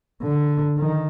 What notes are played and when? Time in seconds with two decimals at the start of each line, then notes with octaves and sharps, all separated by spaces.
0.23 D3
0.79 D#3